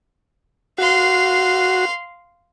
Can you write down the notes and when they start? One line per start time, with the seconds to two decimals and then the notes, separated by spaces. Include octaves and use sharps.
0.78 F#4 F5 C6